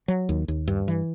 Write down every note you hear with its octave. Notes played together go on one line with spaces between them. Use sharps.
F#3
D#2
D#2
G2
E3